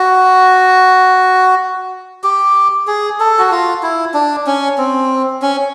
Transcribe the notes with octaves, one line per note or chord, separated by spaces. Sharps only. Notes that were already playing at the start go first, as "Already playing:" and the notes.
Already playing: F#4
G4
G#4
A4
F#4
F4
E4
D4
C#4
C4
C#4